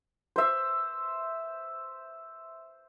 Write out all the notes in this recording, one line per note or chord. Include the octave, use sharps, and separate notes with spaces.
C5 E5